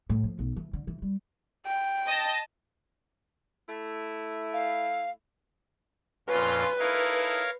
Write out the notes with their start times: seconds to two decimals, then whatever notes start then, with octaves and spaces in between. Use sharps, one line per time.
0.10 A2
0.24 F3
0.39 B1
0.56 E3
0.73 D3
0.87 E3
1.02 G3
1.66 G5
2.08 D#5 A5 A#6
3.67 A3 E4
4.53 F5
6.29 F2 A#2 C#4 F4 B4
6.79 D#4 E4 A4 A#4 C#5 F5